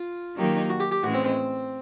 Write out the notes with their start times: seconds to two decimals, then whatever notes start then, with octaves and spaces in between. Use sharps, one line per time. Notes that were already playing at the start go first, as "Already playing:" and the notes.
Already playing: F4
0.36 D#3 F#3 A#3 D#4 G4
0.70 F#4
0.80 G4
0.91 G4
1.03 A2 E3 G#3 C#4 F#4
1.13 C4
1.24 C4